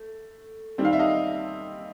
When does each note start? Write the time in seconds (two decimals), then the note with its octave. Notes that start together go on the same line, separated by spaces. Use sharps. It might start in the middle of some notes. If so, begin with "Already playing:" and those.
Already playing: A3
0.78 D#3 G3 C4
0.85 F5
0.93 E5
0.99 D#5 F5